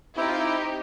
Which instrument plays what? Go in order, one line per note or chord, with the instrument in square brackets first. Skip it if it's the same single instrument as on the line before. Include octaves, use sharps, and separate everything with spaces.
[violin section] C4 D#4 G4 [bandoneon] E4
[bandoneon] F4
E4